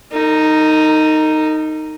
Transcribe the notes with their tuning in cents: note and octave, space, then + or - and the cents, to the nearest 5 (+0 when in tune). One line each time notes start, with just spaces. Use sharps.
D#4 +0 A#4 -45